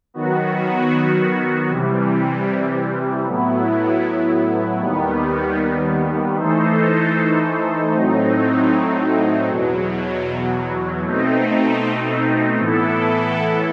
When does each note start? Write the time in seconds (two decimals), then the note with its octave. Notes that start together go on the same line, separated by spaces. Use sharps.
0.14 D#3 F#3 B3 F#4
1.69 C3 E3 G3
3.25 A2 F#3 B3 E4
4.80 D#2 D#3 G3 B3
6.37 E3 A3 D#4 A4 C5
7.92 A2 F#3 A3 C4 D#4
9.48 E2 B2 F#3
11.04 B2 A3 C4 D#4
12.59 A2 E3 B3 E4 A4